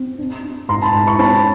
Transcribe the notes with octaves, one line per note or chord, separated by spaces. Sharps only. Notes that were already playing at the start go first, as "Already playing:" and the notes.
Already playing: C4
D4
D4
G#2 A#5 C6
A5 B5
G#2
B5 C#6
C#4 A5 B5